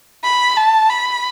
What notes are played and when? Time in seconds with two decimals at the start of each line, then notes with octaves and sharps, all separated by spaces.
0.24 B5
0.57 A5
0.89 B5